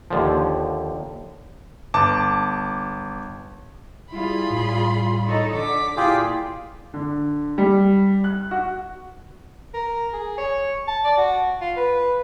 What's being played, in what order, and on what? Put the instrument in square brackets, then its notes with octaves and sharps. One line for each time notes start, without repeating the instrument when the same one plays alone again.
[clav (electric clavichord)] D#2 D3 F3
[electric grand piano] G1 A5 D6
[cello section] G3 F4 G#4 [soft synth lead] E4 [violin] B5 C6
[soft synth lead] A2
[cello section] D#4 A4 C#5
[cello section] D3 [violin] D6 B6
[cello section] A#2 [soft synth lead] E4 [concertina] F4 G4 G#4
[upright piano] D3
G3
F#6
F#4
[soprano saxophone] A#4
G#4
C#5
A5
D5
F#4
F4
B4